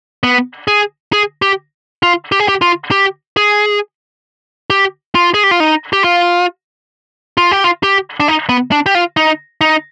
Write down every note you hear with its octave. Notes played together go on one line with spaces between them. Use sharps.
B3
G#4
G#4
G4
F4
G4
G#4
G4
F4
G4
G#4
G4
F4
G#4
G4
F4
D#4
G4
F4
F4
G4
F4
G4
D4
D#4
B3
D4
G4
F4
D#4
D#4